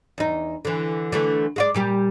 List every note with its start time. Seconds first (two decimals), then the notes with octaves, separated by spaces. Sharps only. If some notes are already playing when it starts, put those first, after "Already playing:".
0.18 E2 D#4
0.65 D3 E3
1.12 D3 E3 A3
1.56 G#3 F4 D5
1.74 A#2 G3 G4